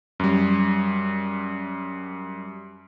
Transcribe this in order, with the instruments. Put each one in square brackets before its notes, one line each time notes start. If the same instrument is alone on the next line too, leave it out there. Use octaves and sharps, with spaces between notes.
[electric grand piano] F#2 G3